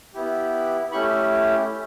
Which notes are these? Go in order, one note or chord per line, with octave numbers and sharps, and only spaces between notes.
B3 E4 G4
A3 C#4 E4 G4 B5 C#6